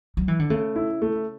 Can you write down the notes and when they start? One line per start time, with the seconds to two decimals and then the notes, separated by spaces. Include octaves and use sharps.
0.17 F#3
0.28 E3
0.39 D3
0.50 C#3 A3
0.76 E4
1.02 A3